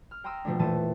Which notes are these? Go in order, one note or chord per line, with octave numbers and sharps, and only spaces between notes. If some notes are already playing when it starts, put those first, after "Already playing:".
F6
G5 A#5 C6 D#6 E6
B2 F3 A3 D4
E1 A#2 E3 A3 A5 D#7